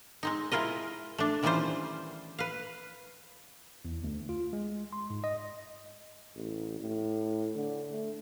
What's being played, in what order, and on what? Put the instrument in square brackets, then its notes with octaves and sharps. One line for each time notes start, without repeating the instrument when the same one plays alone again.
[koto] G#3 C4 D#4
G#3 E4 F4 A#4 D#5
A3 D4
D#3 E3 G3 C#4 F4 C5
B4 F5
[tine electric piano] E2
D2
F4
G#3
C6
G#2
D#5
[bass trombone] A1
A2
D3
A3